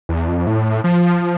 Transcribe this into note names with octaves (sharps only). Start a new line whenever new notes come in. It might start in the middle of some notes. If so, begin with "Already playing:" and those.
E2
F2
A2
F3